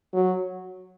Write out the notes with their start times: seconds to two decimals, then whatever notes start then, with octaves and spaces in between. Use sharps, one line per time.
0.14 F#3